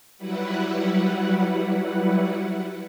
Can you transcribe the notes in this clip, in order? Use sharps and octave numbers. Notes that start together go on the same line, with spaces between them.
F#3 G3 E4 B4 F#5